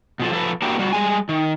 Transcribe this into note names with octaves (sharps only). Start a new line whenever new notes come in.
B2 F3 A4
F3 A4 B4
A#3 D4 E4 F#4 G4
G3 F#4
G3 G#3 G#5
D#3